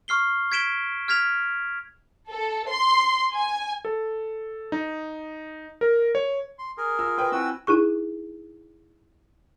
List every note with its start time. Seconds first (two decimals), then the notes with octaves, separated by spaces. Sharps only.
0.08 C#6 F6 C7 G7
0.52 G#6 B6 D7 E7 G7
1.08 F6 G#6 B6 F7
2.29 A4
2.70 C6
3.35 G#5
3.85 A4
4.72 D#4
5.81 A#4
6.15 C#5
6.59 C6
6.78 G#4 A#4
6.99 F4 E6
7.18 B4 G5
7.32 C4 E4 F#4 G#5 E6
7.67 D#4 E4 G#4 C#6